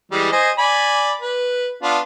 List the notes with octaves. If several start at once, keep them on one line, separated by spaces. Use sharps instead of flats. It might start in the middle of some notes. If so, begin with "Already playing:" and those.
E3 G3 G#3
C5 D#5 G#5
D5 G#5 B5
B4
B3 D4 F4